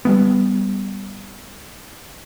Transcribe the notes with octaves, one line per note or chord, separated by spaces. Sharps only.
G3 A3 B3